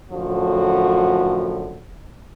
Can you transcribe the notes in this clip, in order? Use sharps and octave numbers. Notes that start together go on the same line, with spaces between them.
F#2 A2 D3 F3 F#4